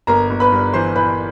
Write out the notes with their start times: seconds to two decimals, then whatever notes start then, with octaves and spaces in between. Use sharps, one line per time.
0.07 G1 A#4 A#5
0.30 G1
0.40 B4 B5
0.52 G2
0.73 E3 C5 C6
0.95 E3 B4 B5